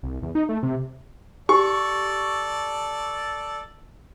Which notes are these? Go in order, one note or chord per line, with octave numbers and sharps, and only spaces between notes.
C2
E2
D#4
A3
C3
G4 A4 D5 C#6